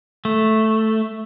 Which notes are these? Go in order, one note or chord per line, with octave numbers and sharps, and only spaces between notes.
A3